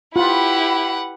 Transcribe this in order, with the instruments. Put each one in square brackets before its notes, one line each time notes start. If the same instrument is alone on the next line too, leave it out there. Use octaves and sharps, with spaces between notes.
[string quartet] E4 G4 [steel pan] F4 B5 [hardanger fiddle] B4 F#5